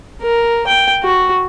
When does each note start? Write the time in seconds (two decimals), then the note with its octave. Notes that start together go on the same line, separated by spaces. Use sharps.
0.22 A#4
0.67 G5
1.03 F#4